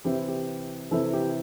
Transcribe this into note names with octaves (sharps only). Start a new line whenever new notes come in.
C3 E3 C4 E4 G4
G4
C3 E3 C4 E4 A4
G4